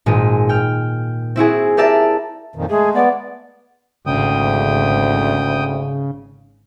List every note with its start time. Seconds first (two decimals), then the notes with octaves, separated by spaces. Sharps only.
0.06 G#1 A#2 G#3 D#7
0.49 G5 F6
1.36 C4 E4 F#4 G#4
1.77 G4 A#4 D5 E5 A5
2.56 F2 A#2 D#3
2.70 G#3 A3 G#4
2.95 B3 D5
4.06 G#1 D2 C#3 G5 D#6